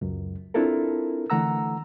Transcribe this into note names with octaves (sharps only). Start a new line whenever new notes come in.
C#2 F#2
C4 D4 E4 F4 A4 A#4
D3 E3 A3 F#5 A#5 E6